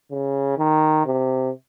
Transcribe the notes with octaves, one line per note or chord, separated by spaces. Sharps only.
C#3
D#3
C3